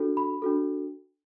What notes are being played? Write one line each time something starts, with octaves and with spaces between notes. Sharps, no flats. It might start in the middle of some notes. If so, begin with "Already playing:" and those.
Already playing: D4 F#4 A4
B5
D4 F#4 A4